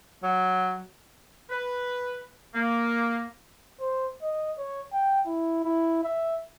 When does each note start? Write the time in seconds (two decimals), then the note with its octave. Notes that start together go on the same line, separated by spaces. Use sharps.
0.23 F#3
1.50 B4
2.54 A#3
3.80 C5
4.22 D#5
4.58 C#5
4.92 G5
5.26 E4
5.64 E4
6.03 E5